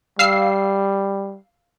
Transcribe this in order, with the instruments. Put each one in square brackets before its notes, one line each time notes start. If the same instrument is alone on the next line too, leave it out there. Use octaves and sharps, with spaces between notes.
[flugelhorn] G3 [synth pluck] F5 E6 C7